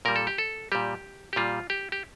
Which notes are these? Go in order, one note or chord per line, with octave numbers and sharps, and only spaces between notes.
A#2 G3 A#4
A4
G4
A4
A#2 G3 G4
G4
A#2 G3 F4
G4
G4